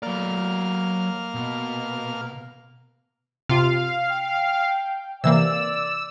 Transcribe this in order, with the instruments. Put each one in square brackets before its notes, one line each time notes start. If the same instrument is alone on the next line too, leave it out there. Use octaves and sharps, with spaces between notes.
[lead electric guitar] F#3 D5 [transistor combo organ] A#3 F6
[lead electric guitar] B2
[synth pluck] C3 F4 [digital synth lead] F5
[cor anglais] G5
[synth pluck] C3 E3 A#3 [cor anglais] D5 [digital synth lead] E6